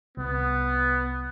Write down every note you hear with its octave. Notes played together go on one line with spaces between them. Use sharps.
C2 B3